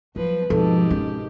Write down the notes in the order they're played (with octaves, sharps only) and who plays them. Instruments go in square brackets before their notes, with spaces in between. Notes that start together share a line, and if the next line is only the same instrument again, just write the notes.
[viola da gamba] F3 B4 [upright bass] F#3
[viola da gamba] G#2 G4 [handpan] B2 C4 A4 [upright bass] F3
[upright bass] C#4